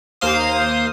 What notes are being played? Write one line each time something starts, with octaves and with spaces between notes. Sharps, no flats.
D#2 A#3 C5 F5 D#6